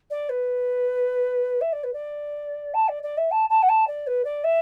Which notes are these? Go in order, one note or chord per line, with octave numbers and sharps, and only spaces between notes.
D5
B4
E5
D5
B4
D5
A5
D5
D5
E5
A5
A5
F#5
A5
D5
B4
D5
E5